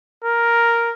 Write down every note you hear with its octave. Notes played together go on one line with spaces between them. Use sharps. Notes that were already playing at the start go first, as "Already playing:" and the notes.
A#4